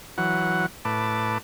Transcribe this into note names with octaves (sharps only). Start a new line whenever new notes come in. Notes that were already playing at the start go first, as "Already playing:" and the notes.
E3 F#3 F#5
A2 B4 A5 D6